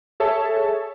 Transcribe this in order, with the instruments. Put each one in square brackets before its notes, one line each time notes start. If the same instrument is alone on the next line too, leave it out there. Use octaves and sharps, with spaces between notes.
[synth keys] G#4 A4 C#5 E5 A5